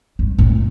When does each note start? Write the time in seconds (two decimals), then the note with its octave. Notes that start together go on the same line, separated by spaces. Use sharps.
0.19 G2
0.38 A2